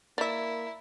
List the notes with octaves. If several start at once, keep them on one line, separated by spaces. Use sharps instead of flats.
A#3 E4 D5 E5